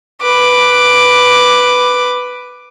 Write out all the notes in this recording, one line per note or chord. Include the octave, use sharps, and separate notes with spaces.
B4 D6